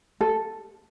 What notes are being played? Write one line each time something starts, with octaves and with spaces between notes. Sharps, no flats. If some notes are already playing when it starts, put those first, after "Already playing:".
A4